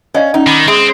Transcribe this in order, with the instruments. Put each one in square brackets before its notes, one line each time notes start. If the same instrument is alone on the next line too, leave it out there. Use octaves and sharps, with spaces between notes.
[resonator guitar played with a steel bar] C#4 [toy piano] D5 D#5 F5
[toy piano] C#4 [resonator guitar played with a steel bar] D#4
[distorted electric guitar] D#3 [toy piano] B5 D6
[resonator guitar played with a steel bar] G#3 [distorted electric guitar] C4